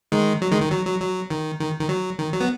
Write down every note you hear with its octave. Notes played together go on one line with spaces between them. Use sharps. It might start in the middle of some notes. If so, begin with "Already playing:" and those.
D#3 G#3
F#3
D#3 G#3
D#3
F#3
F#3
F#3
D#3
D#3
D#3
F#3
D#3
F#3
B3